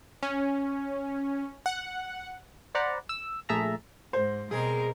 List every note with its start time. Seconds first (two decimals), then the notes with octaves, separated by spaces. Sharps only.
0.23 C#4
1.66 F#5
2.75 C5 D5 F#5 A#5 B5
3.09 E6
3.49 A#1 A3 G#4 E5 A5 A#5
4.13 G#2 C5
4.51 B2 G3 G#3 C4 G#4 A#4